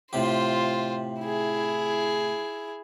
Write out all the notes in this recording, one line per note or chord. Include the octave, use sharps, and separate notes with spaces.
A2 C3 F4 G4 C5
E4 G#4